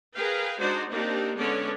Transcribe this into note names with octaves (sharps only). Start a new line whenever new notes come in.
G#4 A#4 B4 F5 G5
G#3 D4 D#4 F#4 C5 D5
A#3 C4 D4 D#4 G4
D3 G#3 B3 C#4 C#5 D5